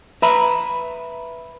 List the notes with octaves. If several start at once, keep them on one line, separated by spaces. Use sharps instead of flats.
B4 E5 A#5 B5